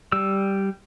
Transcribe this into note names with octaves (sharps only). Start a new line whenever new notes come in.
G3 E6